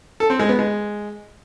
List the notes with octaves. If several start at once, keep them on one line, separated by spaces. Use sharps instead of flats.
A4
C4
G#3
B3
G#3